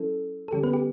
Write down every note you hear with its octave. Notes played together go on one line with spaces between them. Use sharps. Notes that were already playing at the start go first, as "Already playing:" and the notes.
Already playing: F#3 C#4 E4 A4
A4
D3 G3 C#4 G4
B3 B4
G4